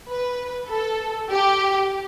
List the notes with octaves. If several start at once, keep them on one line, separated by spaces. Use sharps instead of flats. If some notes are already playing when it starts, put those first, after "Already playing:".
B4
A4
G4